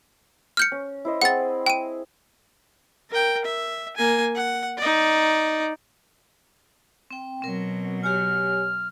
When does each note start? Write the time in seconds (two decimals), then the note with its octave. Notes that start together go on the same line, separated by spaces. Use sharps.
0.57 F6 G6 C#7
0.72 C#4
1.05 E4 C5 D#5
1.22 C4 G#4 F#5 A6
1.66 G5 D#7
3.10 A#4 G5
3.45 E5
3.97 A#3 G#5
4.36 F#5
4.78 D#4 D5
7.11 C4 G5
7.42 B2 F#3 C4 A#4
8.04 G4 C#5 G#5 F6